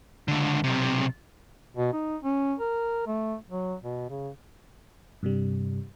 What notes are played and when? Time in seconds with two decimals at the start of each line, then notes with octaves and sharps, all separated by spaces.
0.28 C#2 D3
0.64 B1 C3
1.77 B2
1.93 D#4
2.23 C#4
2.59 A#4
3.07 A3
3.49 F#3
3.83 B2
4.09 C#3
5.23 G2 C3 G3